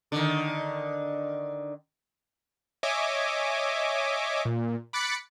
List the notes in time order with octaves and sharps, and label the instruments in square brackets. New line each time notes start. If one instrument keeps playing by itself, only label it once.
[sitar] D3 D#3
[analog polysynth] C#5 D#5 E5 G#5 D6
A#2
B5 D6 F#6 A6 B6 C#7